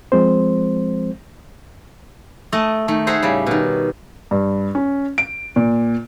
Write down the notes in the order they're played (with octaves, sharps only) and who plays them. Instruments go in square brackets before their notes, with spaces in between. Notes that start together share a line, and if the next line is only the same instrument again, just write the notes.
[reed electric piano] F3 G#3 C4 C5
[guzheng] A3 D#5 A5
D#3 A3
G#4 C5 E5 F#5 G#5 A#5
A2 C#3 G3
B2 D#3
[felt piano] G2
C#4
D7
A#2